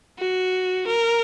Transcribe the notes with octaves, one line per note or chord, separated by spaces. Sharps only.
F#4
A#4